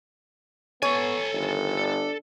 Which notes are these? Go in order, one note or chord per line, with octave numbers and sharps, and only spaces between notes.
B3 A4 C#5 G#5
G1 D#3
D4